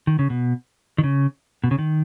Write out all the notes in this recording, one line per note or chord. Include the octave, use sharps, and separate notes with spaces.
D#3
C#3
B2
D#3
C#3
B2
C#3
D#3